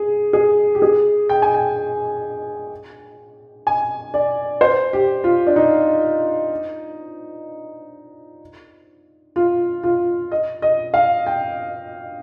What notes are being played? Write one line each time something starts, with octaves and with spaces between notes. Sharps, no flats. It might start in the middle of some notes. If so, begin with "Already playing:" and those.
Already playing: G#4
G#4
G4
G#4
G5
G#5
G5
G#5
D5
C5
G4
F4
D4
D#4
F4
F4
D#5
D#5
F5
G5